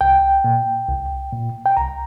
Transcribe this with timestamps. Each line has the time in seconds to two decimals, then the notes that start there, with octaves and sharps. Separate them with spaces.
0.01 C2 G5
0.44 A#2
0.89 C2
1.33 A#2
1.66 G5
1.77 C2 A#5